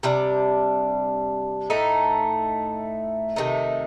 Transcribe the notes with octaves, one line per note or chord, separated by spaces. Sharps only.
C3 G3 D4
A2 A3 D#4
C3 D#3 A3 D#4